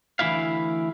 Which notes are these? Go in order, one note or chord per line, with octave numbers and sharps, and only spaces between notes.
D2 E3 C#4 E4 E5 F5